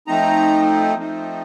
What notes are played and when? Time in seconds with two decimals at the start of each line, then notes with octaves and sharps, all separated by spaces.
0.07 F3 A3 C4 D#4 A#5
0.97 F3 A3 C4 D#4